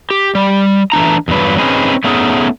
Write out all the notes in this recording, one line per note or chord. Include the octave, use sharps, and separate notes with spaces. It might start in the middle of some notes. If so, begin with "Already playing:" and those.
G4
G3
E3 A3 D4 A#5
E2 G2 F#3 B4
C4 C#4 D#4 G#4 B4
A3 B3 C#4 D#4 G#4